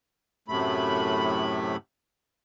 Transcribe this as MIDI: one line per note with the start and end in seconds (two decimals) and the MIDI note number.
0.48 1.76 42
0.48 1.76 45
0.48 1.76 48
0.48 1.76 57
0.48 1.76 83